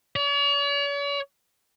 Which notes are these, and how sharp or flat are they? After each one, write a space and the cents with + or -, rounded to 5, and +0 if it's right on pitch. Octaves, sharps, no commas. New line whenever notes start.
C#5 +45